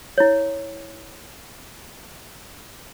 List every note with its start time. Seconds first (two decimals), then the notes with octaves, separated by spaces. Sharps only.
0.18 E4 C#5